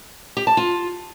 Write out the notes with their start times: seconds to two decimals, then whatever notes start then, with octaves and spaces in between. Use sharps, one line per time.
0.37 G4
0.47 A5
0.57 F4